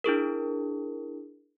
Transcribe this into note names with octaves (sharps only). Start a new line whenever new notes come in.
D4 E4 G#4 A#4